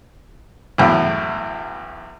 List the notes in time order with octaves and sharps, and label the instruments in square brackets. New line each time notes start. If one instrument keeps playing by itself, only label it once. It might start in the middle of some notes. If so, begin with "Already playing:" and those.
[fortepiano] B1 E2 A2